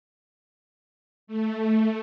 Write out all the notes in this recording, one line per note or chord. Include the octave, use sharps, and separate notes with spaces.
A3